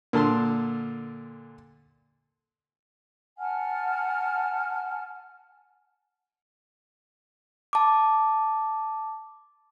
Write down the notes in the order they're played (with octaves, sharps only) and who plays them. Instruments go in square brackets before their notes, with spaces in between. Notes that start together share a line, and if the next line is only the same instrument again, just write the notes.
[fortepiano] A#2 D3 A5 C6
[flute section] F#5 G#5 A5 F6
[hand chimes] A5 D6